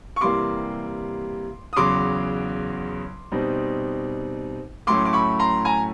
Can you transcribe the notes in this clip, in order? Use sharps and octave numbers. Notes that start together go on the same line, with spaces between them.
C#6
C3 E3 G3 A#3 C6 D6
D#6
E2 C#3 F#3 C6 D6
B2 G3 C4 D#4
A2 F#3 A3 C#4 E4 C6 D6
D6
B5 C#6
A#5 C6
G#5 A#5